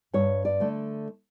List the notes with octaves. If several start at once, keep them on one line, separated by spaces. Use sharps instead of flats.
G2 C#5
D5
D3 A3